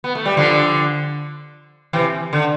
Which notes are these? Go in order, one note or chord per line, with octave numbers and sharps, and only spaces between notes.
B3
A3
G3
D3 F3
C3 E3
D3